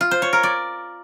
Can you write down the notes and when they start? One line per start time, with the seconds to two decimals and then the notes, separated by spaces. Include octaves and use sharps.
0.01 F4
0.11 C5
0.22 C#5
0.33 A#4
0.43 D5